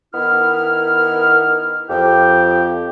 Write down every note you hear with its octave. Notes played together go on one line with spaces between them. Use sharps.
D#3 B3 E4 F6
F2 G4 G5